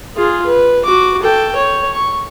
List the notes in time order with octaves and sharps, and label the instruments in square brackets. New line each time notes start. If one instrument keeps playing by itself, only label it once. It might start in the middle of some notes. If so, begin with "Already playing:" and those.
[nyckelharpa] F4 G#4
B4
F#4 D6
A4 G5
C#5
C#6